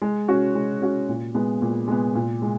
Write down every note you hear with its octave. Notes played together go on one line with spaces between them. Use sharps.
G#3
C#4 F#4
G#3
C#4 F#4
A#2
G#3 B3
A#2
G#3 B3
A#2
G#3